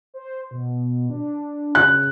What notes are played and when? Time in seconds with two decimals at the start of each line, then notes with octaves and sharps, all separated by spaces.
0.14 C5
0.51 B2
1.10 D4
1.75 C#3 F#6